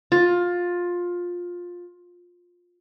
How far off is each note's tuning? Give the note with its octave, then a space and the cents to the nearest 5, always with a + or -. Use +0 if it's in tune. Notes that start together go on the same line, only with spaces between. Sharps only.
F4 +15